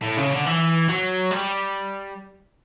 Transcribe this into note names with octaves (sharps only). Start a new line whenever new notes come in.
A2
C#3
D3
E3
F#3
G3